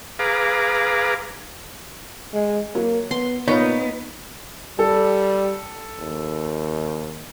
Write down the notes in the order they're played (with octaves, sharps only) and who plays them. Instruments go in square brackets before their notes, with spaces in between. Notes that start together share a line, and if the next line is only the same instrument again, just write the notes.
[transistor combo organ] G#4 B4 F5 A#5 D6
[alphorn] G#3
[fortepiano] F#3 [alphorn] A#3
[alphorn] B3 [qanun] C6
[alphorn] A#2 [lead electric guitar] B3 [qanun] D#4 [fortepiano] F4 B4 C#5
[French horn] G3 [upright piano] A4
[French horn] D#2